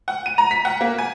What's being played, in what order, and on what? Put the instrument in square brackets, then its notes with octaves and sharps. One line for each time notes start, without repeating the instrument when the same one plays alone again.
[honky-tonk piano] F#5
D#7
A#5
B6
F#5
A#3
G#5